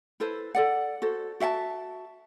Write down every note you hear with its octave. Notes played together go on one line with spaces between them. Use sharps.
E4 A4 B4 C5
A4 D5 F#5
F#4 A4 C5
F#4 E5 F#5 A5